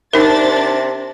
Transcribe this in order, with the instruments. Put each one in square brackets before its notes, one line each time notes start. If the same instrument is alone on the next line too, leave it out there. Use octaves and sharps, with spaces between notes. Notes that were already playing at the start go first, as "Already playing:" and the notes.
[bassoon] C3 [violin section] D4 C5 A6 [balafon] D#4 A#4